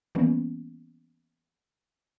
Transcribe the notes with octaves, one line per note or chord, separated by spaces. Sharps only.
E3 G3 A#3 B3 C#4